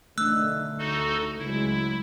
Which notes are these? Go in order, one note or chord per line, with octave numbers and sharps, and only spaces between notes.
B1 D3 D#3 A3 D4 E6 F#6
D2 D#4 F#4 A4
C#2 F#3 G#3 E4